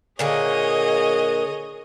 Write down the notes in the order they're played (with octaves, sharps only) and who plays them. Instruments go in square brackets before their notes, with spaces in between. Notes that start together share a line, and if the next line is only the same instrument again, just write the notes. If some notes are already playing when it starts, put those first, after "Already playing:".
[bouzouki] A#2 D3 A#3 [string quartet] G#4 C#5 D#5